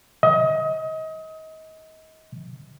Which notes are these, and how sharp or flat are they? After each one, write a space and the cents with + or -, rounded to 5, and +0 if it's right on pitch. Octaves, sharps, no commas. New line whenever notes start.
D#5 +30